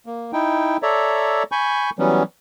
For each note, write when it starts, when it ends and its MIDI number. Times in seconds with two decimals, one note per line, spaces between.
0.06 0.31 58
0.33 0.77 63
0.33 0.77 64
0.33 0.77 79
0.83 1.43 69
0.83 1.43 73
0.83 1.43 74
0.83 1.43 76
0.83 1.43 82
1.52 1.90 80
1.52 1.90 83
1.52 1.90 85
1.52 1.90 91
1.99 2.23 52
1.99 2.23 54
1.99 2.23 55
1.99 2.23 59
1.99 2.23 61